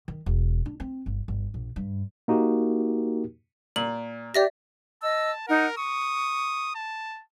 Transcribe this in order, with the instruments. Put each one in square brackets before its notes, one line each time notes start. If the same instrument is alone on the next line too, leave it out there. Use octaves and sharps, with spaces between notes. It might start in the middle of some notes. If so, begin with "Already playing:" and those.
[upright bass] D#3
E1
D4
C4
G1
G1
A#1
G2
[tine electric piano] A#3 D#4 F#4 G4 A#4
[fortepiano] A#2 [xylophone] F#7
[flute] G4 [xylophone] D5 E5 A#6
[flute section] D#5 E6 [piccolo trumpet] A5
[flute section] D#4 F#5 [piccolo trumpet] A#4
[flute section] C#6 [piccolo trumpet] D#6
[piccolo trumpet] A5